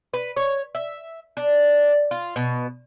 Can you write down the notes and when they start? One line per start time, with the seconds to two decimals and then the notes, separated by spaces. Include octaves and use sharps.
0.13 B4
0.36 C#5
0.75 E5
1.37 D4
2.11 F4
2.36 B2